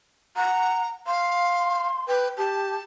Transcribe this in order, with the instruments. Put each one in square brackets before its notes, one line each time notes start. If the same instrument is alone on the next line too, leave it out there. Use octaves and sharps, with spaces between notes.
[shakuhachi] F#5 [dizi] A#5
[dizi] F5 [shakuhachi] C6
[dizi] B4 [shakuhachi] G5
[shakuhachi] G4 [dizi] A5